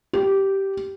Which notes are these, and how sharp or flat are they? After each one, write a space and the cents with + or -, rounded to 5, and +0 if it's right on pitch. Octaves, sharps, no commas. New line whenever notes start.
G4 -10